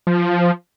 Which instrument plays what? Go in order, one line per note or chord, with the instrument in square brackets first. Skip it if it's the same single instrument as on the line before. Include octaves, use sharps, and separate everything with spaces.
[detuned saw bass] F3